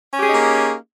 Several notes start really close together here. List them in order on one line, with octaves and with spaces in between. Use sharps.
C#4 G4 G#4 D#4 A#3